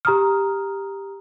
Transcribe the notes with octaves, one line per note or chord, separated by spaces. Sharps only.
G4 A#5 D#6 F6